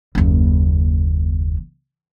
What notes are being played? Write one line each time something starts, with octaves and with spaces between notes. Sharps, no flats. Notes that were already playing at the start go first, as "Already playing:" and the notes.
F#1 D#2